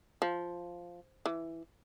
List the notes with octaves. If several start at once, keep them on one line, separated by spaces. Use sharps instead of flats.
F3
E3